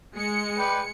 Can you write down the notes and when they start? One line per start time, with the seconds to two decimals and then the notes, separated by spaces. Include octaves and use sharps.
0.16 G#3 C#7
0.58 B4 D5 G5